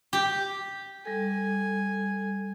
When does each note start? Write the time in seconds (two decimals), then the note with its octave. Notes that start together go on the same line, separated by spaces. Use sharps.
0.13 G4
1.05 G3 A4 G#5